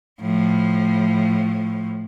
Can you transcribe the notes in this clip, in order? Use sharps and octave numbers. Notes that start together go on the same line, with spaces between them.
A2 F3